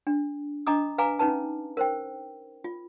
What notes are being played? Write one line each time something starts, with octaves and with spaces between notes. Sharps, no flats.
D4
D4 D#5 A#5 D6 D#6
B4 F5 G#5 A#5 D6
C#4 D#4 B4 A5
A#4 C5 G5
F4